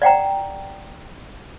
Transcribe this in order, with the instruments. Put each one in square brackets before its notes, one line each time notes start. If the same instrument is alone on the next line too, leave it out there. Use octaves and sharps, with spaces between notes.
[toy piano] D5 F#5 G5 A#5